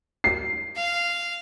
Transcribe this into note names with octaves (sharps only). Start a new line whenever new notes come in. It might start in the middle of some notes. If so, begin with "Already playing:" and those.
C7
F5